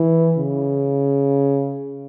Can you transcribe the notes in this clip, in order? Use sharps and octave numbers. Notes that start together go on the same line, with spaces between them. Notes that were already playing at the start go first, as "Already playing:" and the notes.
Already playing: E3
C#3